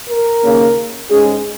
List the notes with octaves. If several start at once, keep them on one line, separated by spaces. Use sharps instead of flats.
A#4
D#2 C#3 A#3 C#4
G#2 G#3 C#4 G#4